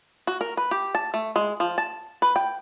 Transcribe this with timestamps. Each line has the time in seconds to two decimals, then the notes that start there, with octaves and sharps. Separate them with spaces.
0.27 F#4
0.41 A#4
0.57 B4
0.71 G4
0.95 A5
1.14 A3
1.36 G#3
1.60 F3
1.78 A5
2.22 B4
2.36 G5